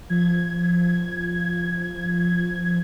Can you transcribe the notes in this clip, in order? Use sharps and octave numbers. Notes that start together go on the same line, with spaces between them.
F3 G#6